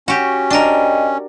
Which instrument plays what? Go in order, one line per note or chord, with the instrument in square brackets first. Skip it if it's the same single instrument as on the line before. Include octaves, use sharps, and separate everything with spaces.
[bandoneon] C#4 [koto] F#4 G4
[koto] D4 A#4 [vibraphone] D#5 G5